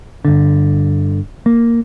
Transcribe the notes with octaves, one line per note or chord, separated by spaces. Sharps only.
G1 D3
A#3